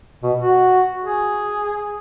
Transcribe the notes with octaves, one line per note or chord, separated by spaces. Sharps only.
B2
F#4
G#4